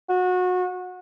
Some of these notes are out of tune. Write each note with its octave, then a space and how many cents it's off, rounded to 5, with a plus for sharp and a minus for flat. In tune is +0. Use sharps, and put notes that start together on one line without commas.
F#4 -25